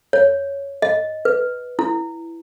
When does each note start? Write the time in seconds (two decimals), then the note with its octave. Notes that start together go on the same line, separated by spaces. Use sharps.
0.13 C#5
0.82 D#5
1.25 B4
1.79 E4